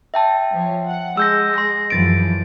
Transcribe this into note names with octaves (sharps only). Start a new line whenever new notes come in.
E5 G5 A5
F3 C#5
F#5
G#3 E6 G6 A#6
C6 A#6
F#2 E3 F3 A6 D7